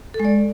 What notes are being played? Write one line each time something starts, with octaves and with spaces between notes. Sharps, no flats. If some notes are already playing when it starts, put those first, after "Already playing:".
A4
G#3
D5